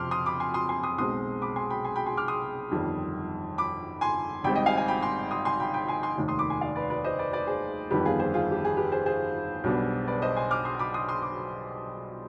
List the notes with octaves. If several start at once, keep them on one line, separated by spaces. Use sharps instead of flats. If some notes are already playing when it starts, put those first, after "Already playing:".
Already playing: F2 C3 F3 C6 D6 F6
C6 D#6
B5 D6
G#5 C6
C6 D#6
G#5 C6
C6 D#6
B1 B2 G#3 C4 C6 D#6
B5 D6
G#5 C6
G5 B5
G#5 C6
G5 B5
G#5 C6
D6 F6
C6 D#6
G1 F2 D#3 G3
B5 D6
G#5 C6
G#1 G#2 G3 C4 G5 B5
D#5 G5
F5 G#5
F5 G#5
G5 B5
G#5 C6
C6 D#6
G#5 C6
G5 B5
G5 B5
G#5 C6
G#5 C6
F1 D#2 D#3
C6 D#6
B5 D6
G#5 C6
D5 F5
B4 D5
B4 D5
C5 D#5
B4 D5
B4 D5
G#4 C5
G1 F2 D#3 G3 B3 G4 B4
F4 G#4
G#4 C5
F4 G#4
G4
G#4
G4 B4
G#4 C5
G#4 C5
B1 B2 G3 B3 D4
B4 D5
C5 D#5
G#5 C6
D6 F6
C6 D#6
B5 D6
C6 D#6
C6 D#6
D6